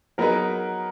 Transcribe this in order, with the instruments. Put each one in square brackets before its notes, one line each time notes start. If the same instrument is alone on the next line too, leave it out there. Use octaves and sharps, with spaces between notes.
[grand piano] F#3 B3 D#4 G#4 B4 [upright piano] A#4